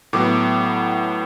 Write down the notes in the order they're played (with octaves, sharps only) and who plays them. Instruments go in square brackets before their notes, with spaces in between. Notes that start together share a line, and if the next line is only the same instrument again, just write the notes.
[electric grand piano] A2 F#3 B3 D6